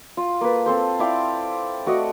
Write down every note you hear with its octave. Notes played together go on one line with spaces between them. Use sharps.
F4
A#3 A4 B4
C4 A4 C5
E4 D5 F5 G5
A3 F#4 D5 D#5